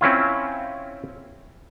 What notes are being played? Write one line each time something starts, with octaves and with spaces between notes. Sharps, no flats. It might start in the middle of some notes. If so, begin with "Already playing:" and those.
C4 C#4 E4 F4